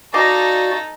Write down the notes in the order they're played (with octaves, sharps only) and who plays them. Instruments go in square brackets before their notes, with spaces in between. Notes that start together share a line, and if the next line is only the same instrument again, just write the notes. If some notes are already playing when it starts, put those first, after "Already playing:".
[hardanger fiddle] D#4 A4 [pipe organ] F#4 D5 [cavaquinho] D#5 F5 D6